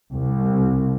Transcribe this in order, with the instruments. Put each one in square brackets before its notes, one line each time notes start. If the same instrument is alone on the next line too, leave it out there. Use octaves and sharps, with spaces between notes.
[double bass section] C2